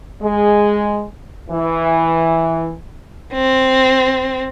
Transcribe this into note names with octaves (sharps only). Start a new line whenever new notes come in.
G#3
E3
C4